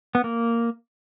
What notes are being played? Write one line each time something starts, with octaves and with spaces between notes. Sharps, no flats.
B3
A#3